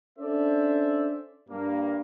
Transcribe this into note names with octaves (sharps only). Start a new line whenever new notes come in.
C#4 D4 A4 C5 D5 E5
G2 A#3